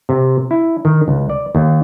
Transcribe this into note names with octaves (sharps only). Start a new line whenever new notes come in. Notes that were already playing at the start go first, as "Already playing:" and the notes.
C3
E4
D#3
C#2
D5
D#2